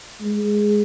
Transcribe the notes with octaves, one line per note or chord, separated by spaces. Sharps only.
G#3